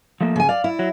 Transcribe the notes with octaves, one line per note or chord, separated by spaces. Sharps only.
F3 A3 A#3
C#3 G#5
D5 F5
E4
F#3